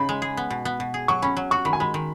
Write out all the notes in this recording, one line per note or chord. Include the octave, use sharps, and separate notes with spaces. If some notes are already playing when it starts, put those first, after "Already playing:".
Already playing: C#3 D#4 B5
G#3
G#4
B3
B2
B3
B2
G#4
F#3 C#6
C#4 B5
F#3
F#4 C#6
D#3 B5
G#5
G#3 B5
D#3